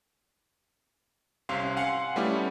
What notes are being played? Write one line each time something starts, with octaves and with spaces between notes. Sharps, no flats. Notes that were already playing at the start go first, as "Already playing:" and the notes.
C2 C3 C#4 F5 C6
F5 F#5 G#5 C6 C#7
G3 A3 B3 C#4 E4 G4